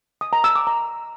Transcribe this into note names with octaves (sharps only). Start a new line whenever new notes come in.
D#6
A#5
E6
D6
A#5